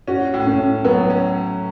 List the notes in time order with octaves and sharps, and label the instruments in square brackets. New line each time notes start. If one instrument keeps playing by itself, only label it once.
[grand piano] C#4 [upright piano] F#4
[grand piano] A2
[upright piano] C#4
[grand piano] A2
[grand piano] F#3 [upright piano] B3
[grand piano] C#4